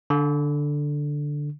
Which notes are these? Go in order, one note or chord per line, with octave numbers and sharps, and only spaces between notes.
D3